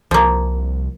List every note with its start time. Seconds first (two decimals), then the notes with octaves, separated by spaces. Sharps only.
0.11 C2 F3 A#3